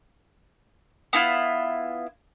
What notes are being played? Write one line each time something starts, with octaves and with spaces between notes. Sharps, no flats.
B3 E4 F4